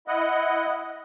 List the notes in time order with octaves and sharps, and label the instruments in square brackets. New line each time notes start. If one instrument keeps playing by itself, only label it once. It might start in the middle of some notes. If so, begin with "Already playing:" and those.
[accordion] E4 D#5 F#5